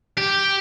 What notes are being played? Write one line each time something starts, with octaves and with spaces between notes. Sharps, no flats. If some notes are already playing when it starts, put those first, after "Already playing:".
G4